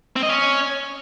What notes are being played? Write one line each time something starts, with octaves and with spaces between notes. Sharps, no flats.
C4
D#5
C#4